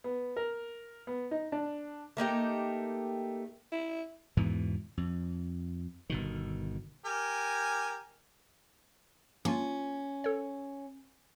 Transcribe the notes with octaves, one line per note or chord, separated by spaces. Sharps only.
B3
A#4
B3
D#4
D4
A3 A#3 D#4 G4
E4
E2 G#2 B2 E3
F2
G1 B2 D#3
G4 A#4 G#5
A#3 C#4 D4 F4
A4 C#5